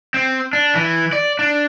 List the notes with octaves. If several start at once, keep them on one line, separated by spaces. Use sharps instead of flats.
C4
D4
E3
D5
D4